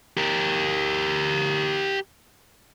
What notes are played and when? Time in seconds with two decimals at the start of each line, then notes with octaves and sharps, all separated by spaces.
0.17 G4 A#4